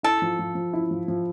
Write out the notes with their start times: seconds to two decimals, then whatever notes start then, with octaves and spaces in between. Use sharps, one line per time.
0.03 E4 A4
0.22 F3
0.39 F3
0.55 F3
0.73 E4
0.91 F3
1.08 F3